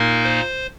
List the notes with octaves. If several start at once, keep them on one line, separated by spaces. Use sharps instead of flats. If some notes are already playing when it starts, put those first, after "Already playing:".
Already playing: A#2 A#3 D#4 A#4
C5